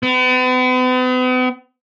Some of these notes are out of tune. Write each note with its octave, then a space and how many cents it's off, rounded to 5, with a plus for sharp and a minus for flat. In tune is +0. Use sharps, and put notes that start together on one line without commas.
B3 +45